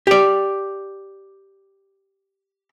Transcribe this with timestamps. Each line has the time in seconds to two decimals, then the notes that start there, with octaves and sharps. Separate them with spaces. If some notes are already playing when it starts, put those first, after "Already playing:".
0.07 G4 D5